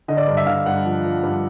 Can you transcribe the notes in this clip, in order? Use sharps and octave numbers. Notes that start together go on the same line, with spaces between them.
D3 D#5
D5
G2
E5
D3 F5
G2 F#5
F3
F3
G2